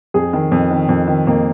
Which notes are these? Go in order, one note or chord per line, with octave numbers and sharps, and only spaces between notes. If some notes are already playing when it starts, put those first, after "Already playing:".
F2 G#4
D#3
F2
D#3
F2
D#3
F2 A#3